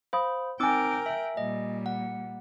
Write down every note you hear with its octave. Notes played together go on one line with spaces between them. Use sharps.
C5 F5 B5 D#6
C4 D#4 A#4 G5 G#5 D6 E6
E5
A#2 G3 D#5
F#5